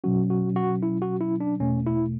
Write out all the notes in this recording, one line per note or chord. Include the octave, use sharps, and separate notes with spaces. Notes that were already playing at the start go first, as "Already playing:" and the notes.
B2 F#3 C#4 F#4
F#4
F#4
E4
F#4
E4
D4
E2 B2 A3 C#4
E4